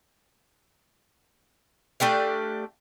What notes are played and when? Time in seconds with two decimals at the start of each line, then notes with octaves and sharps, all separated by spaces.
2.00 A3 D4 G4 F5